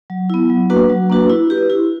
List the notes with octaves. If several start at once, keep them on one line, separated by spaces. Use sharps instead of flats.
F#3
B3 E4
F#3
A#3 D4 F#4 B4
F#3
A#3 D4 F#4 B4
E4
G4 B4
E4